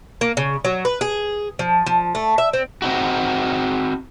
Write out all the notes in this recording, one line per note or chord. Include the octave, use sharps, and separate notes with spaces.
A#3
C#3
F#3
B4
G#4
F3
F3
A3
E5
C4
C4 D#4 F#4